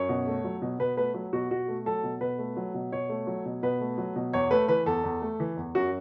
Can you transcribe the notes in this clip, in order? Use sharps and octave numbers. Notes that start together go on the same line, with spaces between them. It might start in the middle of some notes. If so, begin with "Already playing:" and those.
Already playing: F#2 C#5
B2
A3
F#3
B2
B2 B4
A3 B4
F#3
B2 F#4
B2 F#4
A3
F#3 A4
B2
B2 B4
A3
F#3
B2
B2 C#5
A3
F#3
B2
B2 B4
A3
F#3
B2
E2 C#5
A3 B4
E3 B4
E2 A4
E2
A3
E3
E2
F#2 F#4